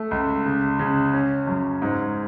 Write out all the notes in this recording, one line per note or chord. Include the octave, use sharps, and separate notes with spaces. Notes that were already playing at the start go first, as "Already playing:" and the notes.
Already playing: A3
C#2
C#3
C#3
C#4
F#2
G#2